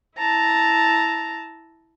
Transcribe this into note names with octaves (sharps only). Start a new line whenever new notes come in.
E4 A5 A#5